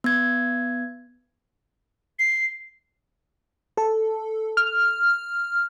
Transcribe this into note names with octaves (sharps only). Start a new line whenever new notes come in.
B3 G#6
C7
A4
F6